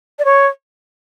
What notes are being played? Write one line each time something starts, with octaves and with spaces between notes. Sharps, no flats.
D5
C#5